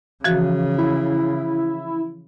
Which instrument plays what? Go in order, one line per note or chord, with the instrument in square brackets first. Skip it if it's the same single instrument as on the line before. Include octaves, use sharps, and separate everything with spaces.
[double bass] C#3 [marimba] E3 F3 F#4
[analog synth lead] E4